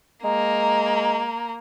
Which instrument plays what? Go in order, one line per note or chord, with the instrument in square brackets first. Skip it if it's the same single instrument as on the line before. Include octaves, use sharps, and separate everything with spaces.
[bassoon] G#3 [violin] A#3 [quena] A#5